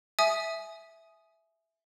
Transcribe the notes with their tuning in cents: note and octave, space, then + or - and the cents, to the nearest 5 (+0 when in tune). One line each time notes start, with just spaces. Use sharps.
E5 +0 G#5 +25 D#6 +0